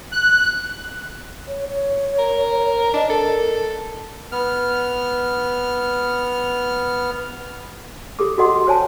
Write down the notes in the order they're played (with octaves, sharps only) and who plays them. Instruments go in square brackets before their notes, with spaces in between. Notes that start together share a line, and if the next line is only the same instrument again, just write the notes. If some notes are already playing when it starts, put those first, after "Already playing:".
[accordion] F#6
[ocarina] C#5
C#5
[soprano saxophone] A#4
[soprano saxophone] D4 [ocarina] D#5
[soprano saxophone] A4 [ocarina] A#4
[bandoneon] B3 F6
[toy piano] G4 A4 D6
F#4 A4 D#5 F#5 C6 D6
C5 C#5 G#5 A5